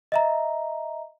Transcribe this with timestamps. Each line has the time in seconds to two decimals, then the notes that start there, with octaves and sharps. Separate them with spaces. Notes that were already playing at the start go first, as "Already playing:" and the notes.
0.12 D#5 E5 A#5